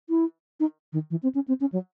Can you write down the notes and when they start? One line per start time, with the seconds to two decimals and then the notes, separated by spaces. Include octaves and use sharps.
0.09 E4
0.60 D#4
0.93 D#3
1.10 E3
1.23 C4
1.35 C#4
1.48 C4
1.61 C#4
1.72 F#3